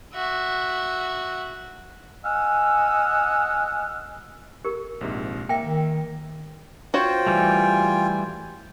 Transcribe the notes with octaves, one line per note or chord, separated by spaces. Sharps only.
F#4 E5
D#5 F#5 G#5 E6 F6
G4 A#4
A#1 G#2 C3
A#3 E5 G5 A#6
D#3
F4 F#4 C5 C#5 G5
E3 G3 A3 G#5